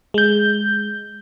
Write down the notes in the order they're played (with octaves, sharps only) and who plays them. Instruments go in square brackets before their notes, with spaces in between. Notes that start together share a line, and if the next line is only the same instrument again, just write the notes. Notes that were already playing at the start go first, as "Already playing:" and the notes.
[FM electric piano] G#3 G6